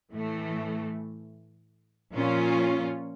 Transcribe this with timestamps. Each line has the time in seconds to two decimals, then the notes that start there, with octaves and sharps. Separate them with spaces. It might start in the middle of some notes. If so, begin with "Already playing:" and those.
0.11 A2 E3 A3
2.12 A#2 F3 C#4 F4